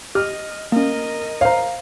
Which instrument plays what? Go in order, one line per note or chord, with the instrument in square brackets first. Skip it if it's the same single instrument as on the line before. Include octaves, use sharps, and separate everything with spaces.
[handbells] G4 [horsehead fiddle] D#5 [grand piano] F6
[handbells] A#3 C#4 [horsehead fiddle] A#4 D#5
[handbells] C5 C#5 [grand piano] F5 A#5